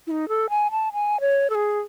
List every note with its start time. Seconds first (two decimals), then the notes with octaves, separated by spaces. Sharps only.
0.07 E4
0.11 D#4
0.29 A4
0.50 G#5
0.71 A5
0.93 G#5
1.21 C#5
1.50 A4
1.55 G#4